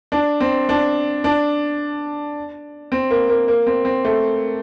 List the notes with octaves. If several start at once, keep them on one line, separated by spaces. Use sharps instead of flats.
D4
C4
D4
D4
C4
A#3
A#3
A#3
C4
C4
A3